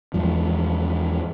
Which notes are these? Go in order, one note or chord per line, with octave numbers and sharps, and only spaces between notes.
E2 G#2 F3